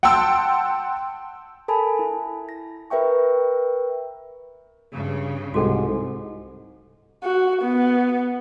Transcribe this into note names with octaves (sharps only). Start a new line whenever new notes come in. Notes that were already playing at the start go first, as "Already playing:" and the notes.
F#5 G5 A5 C6 E6
A4 A#4 G#5 A5 B5
E4
A#6
A#4 B4 E5 G5 C#6
G2 C#3
C2 G#2 F#4 A4 F#5
F#4
B3